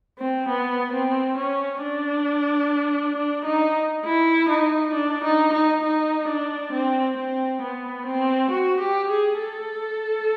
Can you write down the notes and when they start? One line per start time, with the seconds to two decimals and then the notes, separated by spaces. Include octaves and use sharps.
0.19 C4
0.49 B3
0.93 C4
1.38 C#4
1.82 D4
3.16 D4
3.45 D#4
4.05 E4
4.49 D#4
4.94 D4
5.24 D#4
5.53 D#4
5.84 D#4
6.28 D4
6.72 C4
7.17 C4
7.62 B3
8.06 C4
8.51 F#4
8.81 G4
9.10 G#4
9.40 A4